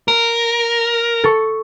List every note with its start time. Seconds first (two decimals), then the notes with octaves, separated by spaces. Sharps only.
0.08 A#4
1.24 A4 C#6